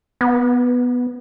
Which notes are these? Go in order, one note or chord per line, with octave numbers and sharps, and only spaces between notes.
B3